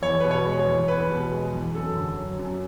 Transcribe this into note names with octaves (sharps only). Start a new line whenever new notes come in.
E2 C#5
B2 B4
C#5
G#3
C#5
E2
E2 B4
B2
G#3
E2
F#2 A4
D3
F#3
F#2